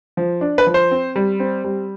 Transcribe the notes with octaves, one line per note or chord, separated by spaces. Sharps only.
F3
D4
B4
F3
C5
C4
G3
C4
G3